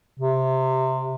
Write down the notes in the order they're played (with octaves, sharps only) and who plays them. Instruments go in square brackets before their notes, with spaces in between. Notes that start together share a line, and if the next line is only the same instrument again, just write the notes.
[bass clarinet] C3